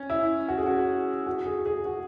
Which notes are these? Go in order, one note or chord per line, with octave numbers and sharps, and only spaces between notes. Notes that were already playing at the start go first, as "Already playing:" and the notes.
Already playing: C#4
E4
F#4
G#4
F#4
F#4
G#4
G#4
F#4